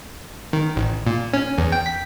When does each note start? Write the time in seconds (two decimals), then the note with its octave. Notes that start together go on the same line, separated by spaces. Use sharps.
0.53 D#3
0.76 A1
1.07 A#2
1.33 C#4
1.58 E2
1.72 G5
1.86 B6